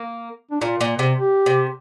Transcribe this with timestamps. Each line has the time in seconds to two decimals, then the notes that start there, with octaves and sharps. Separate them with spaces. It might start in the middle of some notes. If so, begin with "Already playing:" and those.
Already playing: A#3
0.51 D4
0.61 A#2 F4
0.81 A#2
0.99 C3
1.18 G4
1.46 C3